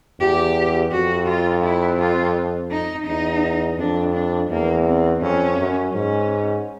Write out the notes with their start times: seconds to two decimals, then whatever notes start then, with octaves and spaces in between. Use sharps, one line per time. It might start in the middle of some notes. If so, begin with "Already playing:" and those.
0.20 E2 G4
0.92 F2 F#4
1.28 F4
1.64 E4
1.99 F4
2.71 D#4
3.07 E2 D#4
3.79 F2 D4
4.14 D4
4.50 E2 A#3
4.86 C4
5.22 F2 C#4
5.58 F#2
5.94 G#2 C#4